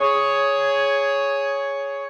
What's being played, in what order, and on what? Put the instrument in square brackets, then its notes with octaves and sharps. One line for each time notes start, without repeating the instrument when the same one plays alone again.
[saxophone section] G#4 C#5